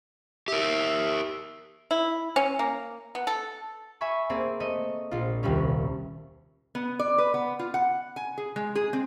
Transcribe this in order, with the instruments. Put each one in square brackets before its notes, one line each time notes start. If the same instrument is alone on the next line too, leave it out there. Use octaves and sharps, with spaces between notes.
[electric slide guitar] G4 A#4 [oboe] E5
[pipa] E4
C#4
A#3
B3
A4
[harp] E5 G#5 B5 C#6
A#3 C4 G#4 D5
A3 D#5 D#6
A#1 F4
D#1 C2 G3 C#4
[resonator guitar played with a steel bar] B3
D5
B4
B3
F4
F#5
G#5
G#4
G#3
G#4
C4